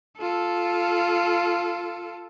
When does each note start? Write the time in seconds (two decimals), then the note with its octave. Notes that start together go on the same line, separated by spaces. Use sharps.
0.18 F4 A4